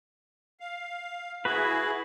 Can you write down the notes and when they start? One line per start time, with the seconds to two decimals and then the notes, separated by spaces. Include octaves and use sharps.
0.60 F5
1.45 E4 F#4 G#4 B4